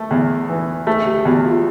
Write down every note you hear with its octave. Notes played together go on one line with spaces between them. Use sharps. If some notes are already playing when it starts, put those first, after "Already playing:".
Already playing: A3
E2
E3
A3 G#4
G4
E2 F#4
F4